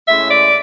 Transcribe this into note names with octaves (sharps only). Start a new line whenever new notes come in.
A2 G#3 C#4 E5
D5